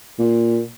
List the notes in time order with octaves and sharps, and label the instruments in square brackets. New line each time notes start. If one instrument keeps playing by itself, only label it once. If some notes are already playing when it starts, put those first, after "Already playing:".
[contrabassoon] A#2